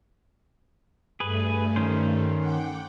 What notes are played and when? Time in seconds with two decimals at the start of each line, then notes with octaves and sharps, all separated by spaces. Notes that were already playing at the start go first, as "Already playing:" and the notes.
1.20 G2 A3 G#4 B4
1.76 D#3 C#4 C5
2.37 F#5 G5 D6